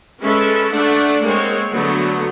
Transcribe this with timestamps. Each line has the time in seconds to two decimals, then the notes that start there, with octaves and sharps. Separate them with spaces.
0.21 G#3 C#4 A4 B4 E5
0.71 A3 D4 A4 D5 F#5
1.25 G#3 A#3 C4 C#5
1.71 D3 F#3 A3 B3